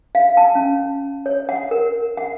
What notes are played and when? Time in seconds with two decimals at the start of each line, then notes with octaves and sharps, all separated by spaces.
0.15 F5
0.37 A5
0.55 C#4
1.26 C#5
1.49 F#5
1.71 A#4
2.17 F#5